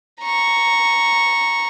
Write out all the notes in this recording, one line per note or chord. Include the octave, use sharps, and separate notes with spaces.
A#5 C#6